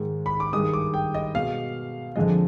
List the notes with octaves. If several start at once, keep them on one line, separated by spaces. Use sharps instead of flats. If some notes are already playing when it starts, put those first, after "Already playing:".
Already playing: G#2 D#3 G#3
B5
D6
G2 D#3 G#3 D#6
D6
G5
D#5
B2 G#3 F5
F2 D3 F3 G#3 D#5